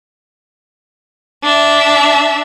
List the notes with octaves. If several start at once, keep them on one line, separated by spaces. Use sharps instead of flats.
D4 E5